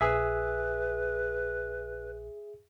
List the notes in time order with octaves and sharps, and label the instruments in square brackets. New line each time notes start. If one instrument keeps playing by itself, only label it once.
[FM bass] A#1 [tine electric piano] G#4 E5 [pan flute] B4